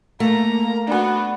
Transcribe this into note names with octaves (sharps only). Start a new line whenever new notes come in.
A3 A#3 A#5
B3 D4 F#4